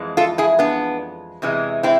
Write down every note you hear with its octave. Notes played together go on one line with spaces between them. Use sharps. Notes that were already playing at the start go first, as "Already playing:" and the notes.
Already playing: F2 E3 G#3
F4 A4
E4 G#4
B3 D4
E2 C3 E3 G#3
C4 E4